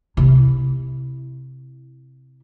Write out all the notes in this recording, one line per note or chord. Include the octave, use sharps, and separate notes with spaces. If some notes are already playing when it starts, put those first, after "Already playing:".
C3 E4